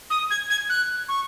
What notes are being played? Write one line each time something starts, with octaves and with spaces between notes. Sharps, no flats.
D#6
G#6
G#6
F#6
C#6